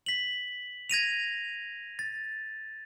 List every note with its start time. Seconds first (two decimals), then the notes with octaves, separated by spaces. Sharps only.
0.06 B6 F#7
0.90 G#6 A#6 D#7 F7
1.99 A6